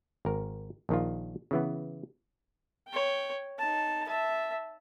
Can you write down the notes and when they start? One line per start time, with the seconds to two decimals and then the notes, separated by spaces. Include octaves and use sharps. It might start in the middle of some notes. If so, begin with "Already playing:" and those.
0.25 G#1 A#4
0.89 A#1 D#3 F4
1.51 C#3 E3 B3
2.89 C#5 G5
3.59 D#4 A5
4.08 E5 A5